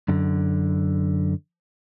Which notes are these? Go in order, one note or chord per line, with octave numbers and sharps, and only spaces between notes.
F#2 D3